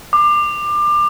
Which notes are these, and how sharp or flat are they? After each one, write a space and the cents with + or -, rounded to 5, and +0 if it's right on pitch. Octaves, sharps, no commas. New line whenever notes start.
D6 +25